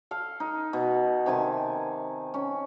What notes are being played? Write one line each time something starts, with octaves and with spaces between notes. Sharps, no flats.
A4 F5
D#4
B2
C3 D#3 G#5 A5
C#4